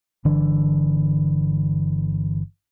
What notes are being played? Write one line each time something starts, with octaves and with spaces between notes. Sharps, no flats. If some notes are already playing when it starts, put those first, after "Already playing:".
G1 D3 E3 D4